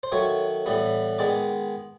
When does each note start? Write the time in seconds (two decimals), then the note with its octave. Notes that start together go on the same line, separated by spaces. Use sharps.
0.03 C5
0.12 D#3 F#3 A3 C#5
0.66 A2 E3 G3 B3
1.19 D#3 G#3 B3 D5